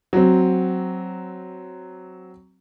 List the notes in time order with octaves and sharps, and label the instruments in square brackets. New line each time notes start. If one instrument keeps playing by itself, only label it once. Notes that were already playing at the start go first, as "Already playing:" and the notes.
[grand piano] F#3 C4